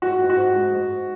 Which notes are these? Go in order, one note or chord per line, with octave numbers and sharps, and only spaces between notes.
G#2 F#4
G#2
F#4
G#2
G#3
G#2